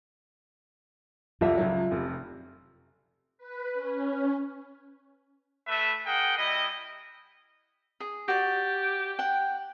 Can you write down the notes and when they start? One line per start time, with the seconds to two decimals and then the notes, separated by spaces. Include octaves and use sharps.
1.41 C2 F2 C3 F4 E5
1.58 C#2 F3 F#3
1.91 F1 C3
3.38 B4
3.74 C#4
5.67 A3 B4 E5
6.05 G#4 A#4 F#5 G5
6.38 G3 E4 D#5
8.00 G#4
8.28 F#4 G4 D5
9.19 F#5 G5